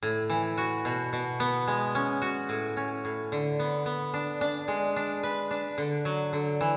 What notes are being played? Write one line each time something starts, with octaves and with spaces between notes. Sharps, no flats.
A2
E3
F#4
B2
B2
B3
G#3
C#4
F#4
A2
C#4
A2
D3
B3
B3
D4
D4
G#3
D4
B4
D4
D3
F#3
D3
E3